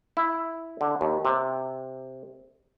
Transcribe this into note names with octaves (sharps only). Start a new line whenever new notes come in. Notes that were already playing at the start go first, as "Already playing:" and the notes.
E4
D3
D#2
C3